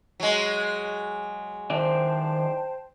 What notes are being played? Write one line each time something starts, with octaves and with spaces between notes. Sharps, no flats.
F#3 G#3
D#3 E4 C5 D5 G5 A5